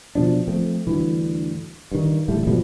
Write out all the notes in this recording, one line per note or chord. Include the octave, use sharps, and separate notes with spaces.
B2 F3 D4
F3 A3 C4
D2 G2 E3
G2 D#3
D1 E3 G3 A3
G#2 B2 F3 G3